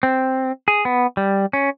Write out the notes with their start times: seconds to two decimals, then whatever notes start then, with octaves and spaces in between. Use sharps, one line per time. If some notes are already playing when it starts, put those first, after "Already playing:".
0.03 C4
0.68 G#4
0.85 B3
1.17 G3
1.53 C#4